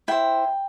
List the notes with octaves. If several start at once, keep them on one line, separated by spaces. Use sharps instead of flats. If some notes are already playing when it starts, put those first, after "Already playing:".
E4 C5 G5